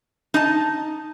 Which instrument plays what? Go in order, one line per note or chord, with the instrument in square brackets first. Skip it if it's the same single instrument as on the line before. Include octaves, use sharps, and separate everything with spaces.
[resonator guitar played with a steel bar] D#4 D#5 A5